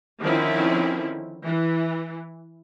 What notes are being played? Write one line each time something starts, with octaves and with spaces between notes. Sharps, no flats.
D3 D#3 F3 C4 C#4 E4
E3